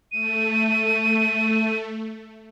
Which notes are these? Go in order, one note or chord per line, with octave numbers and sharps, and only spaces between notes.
A3 D#7